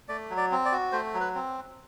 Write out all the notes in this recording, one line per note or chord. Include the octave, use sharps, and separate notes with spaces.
A3 D5
F#3
D5
C4
D5
F#4
A3 C5
F#3
B4
C4